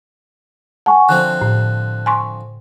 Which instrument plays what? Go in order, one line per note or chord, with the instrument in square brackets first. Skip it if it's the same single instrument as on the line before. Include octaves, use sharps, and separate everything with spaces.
[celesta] F#5 G#5 C#6 [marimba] A5
[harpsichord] D3 F3 C4 [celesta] F#6
[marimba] A2
G#5 C6 C#6